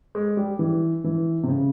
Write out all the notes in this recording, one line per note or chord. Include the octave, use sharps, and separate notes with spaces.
G#3
G3
E3
E3
C3
C#3